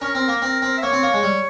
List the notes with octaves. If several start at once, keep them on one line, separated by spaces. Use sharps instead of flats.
C#4 A#4
C4
A#3
C4
C4
E5
A#3 C#5
C4
A#3
G#3
G3